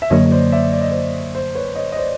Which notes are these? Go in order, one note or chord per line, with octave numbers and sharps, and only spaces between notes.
E5
F#2 D3 F#3 A#3 C#5 D#5
C5 D5
D5 E5
D5
D#5
C5 D5
C5
B4 C#5
C#5 D#5
D#5
C5 D5